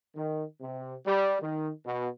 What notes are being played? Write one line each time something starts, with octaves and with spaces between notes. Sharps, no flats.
D#3
C3
G3
D#3
B2